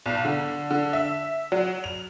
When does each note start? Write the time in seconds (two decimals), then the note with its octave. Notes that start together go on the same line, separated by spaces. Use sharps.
0.06 B1
0.25 D3
0.70 D3
0.93 E5
1.52 F#3
1.84 F7